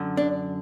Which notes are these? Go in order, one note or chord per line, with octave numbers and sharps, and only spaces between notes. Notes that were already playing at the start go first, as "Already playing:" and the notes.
Already playing: F#2 D3
D4